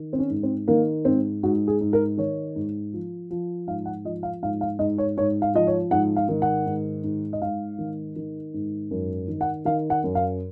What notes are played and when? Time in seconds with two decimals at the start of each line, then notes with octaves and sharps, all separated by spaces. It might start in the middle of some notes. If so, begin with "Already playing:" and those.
Already playing: D#3
0.13 C4
0.19 C#4
0.30 G#2
0.43 C4
0.68 D#3 A#3
1.05 G#2 C4
1.43 G#2 F#4
1.68 G#4
1.81 G#2
1.93 A#4
2.17 D#3 C#5
2.56 G#2
2.93 F3
3.30 F3
3.67 G#2 F5
3.85 F#5
4.05 F3 D#5
4.23 F5
4.43 G#2 F5
4.61 F5
4.79 G#2 D#5
4.98 C#5
5.17 G#2 C#5
5.42 F5
5.54 F3 D#5
5.67 C#5
5.91 G#2 F#5
6.16 F5
6.29 D#3
6.42 F#5
6.66 G#2
7.04 G#2
7.33 D#5
7.42 G#2 F5
7.78 D#3
8.16 D#3
8.54 G#2
8.91 F#2
9.28 D#3
9.41 F#5
9.65 D#3 F5
9.90 F#5
10.04 F#2
10.15 F5